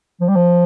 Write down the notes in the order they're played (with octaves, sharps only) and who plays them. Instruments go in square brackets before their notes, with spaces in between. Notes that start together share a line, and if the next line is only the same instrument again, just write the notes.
[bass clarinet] F3
G3
F3